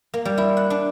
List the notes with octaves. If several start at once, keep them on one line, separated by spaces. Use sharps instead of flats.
A#3
G3
E4
F#5
D4